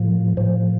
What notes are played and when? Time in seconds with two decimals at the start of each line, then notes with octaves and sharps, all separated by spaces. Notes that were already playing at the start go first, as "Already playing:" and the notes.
Already playing: A2 F3
0.37 A2 F3